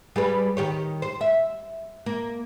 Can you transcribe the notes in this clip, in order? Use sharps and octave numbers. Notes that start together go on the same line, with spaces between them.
G3 G#4 B4
D#3 G4 C#5
C5
E5
A#3